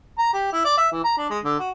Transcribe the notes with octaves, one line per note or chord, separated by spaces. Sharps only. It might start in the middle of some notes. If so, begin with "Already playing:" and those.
A#5
G4
E4
D5
E5
E3
A#5
D4
G#3
D3
F#4